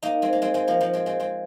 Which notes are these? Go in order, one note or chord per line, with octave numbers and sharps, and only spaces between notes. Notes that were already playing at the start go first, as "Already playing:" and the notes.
A#3 D#4
G#3 C4
A#3
G#3 C4
G#3 C4
F3 A#3
F3 A#3
G#3 C4
G#3 C4
G#3 C4